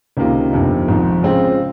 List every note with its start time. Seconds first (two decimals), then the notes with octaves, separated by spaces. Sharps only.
0.17 C#2 C3 D#3 A#3 F4
0.51 G1 F2 C3 D#3
0.88 G#1 G#2 F3
1.22 C#3 G#3 C4 F4